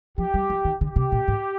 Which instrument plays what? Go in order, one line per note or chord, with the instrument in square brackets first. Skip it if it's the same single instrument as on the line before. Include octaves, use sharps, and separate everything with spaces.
[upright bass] F3 [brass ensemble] G4
[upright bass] G3
F3
D#3
[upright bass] D3 [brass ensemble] G4
[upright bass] C3
A#2
G#2